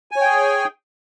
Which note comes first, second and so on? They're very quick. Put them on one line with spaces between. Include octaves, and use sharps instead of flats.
G#5 C#5 G5 G#4